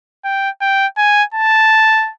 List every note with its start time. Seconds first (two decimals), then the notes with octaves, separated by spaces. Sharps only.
0.24 G5
0.61 G5
0.98 G#5
1.34 A5